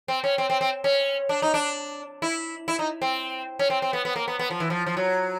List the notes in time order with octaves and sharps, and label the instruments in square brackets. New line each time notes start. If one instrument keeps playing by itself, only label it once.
[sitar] C4
C#4
C4
C4
C4
C#4
D4
D#4
D4
E4
E4
D#4
C4
C#4
C4
C4
B3
B3
A#3
B3
B3
F3
E3
F3
F3
F#3